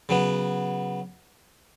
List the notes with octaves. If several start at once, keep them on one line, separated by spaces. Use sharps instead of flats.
C#3 F#3 B3